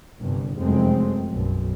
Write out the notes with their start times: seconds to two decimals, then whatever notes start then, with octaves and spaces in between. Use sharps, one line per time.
0.21 G1 C2 G2
0.57 F1 F#2 G#3 A3 C4
1.29 B1 F#2